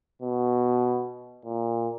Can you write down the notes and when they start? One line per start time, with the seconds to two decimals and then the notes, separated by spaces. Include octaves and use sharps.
0.22 B2
1.45 A#2